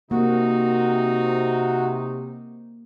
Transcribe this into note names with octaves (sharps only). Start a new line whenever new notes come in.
C3 A#3 D#4 F#4